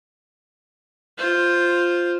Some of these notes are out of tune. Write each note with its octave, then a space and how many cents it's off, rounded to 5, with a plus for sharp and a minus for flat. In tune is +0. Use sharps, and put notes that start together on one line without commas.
F4 +0 C5 +0